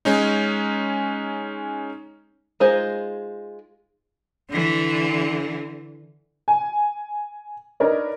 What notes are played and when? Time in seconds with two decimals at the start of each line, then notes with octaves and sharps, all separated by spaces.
0.05 G#3 C#4 D#4
2.60 G#3 D#4 F4 G#4 C5
4.50 D3 E3
6.48 G#5
7.80 D4 D#4 A#4 B4 C#5 D5